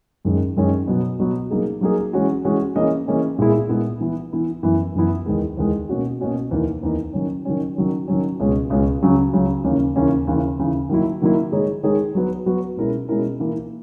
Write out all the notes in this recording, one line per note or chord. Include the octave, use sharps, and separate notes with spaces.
F#2 D#3 G#3 C#4
F#2 D#3 G#3 C#4
B2 F#3 B3
B2 F#3 B3
F#3 A#3 D#4 G#4
F#3 A#3 D#4 G#4
E3 G#3 C#4 F#4
E3 G#3 C#4 F#4
E3 A#3 C#4 G#4 D#5
E3 A#3 C#4 G#4 D#5
A#2 G#3 B3 E4 G#4
A#2 G#3 B3 E4 G#4
E3 B3 E4
E3 B3 E4
F#2 E3 B3 E4
F#2 E3 B3 E4
E2 D#3 G#3
E2 D#3 G#3
B2 A#3 C#4 F#4
B2 A#3 C#4 F#4
E2 D#3 A#3 D#4
E2 D#3 A#3 D#4
D#3 F#3 C#4
D#3 F#3 C#4
D#3 F#3 C#4
D#3 F#3 C#4
C#2 B2 G#3 C#4
C#2 B2 G#3 C#4
C#2 C#3 F#3 C#4
C#2 C#3 F#3 C#4
D#2 C#3 E3 A#3 C#4
D#2 C#3 E3 A#3 C#4
D#2 C#3 E3
D#2 C#3 E3
D#3 F#3 A#3 E4
D#3 F#3 A#3 E4
D#3 G#3 D#4 G#4 C#5
D#3 G#3 D#4 G#4 C#5
F#3 B3 F#4 B4
F#3 B3 F#4 B4
B2 G#3 C#4 E4 A#4
B2 G#3 C#4 E4 A#4
E3 A#3 E4 A#4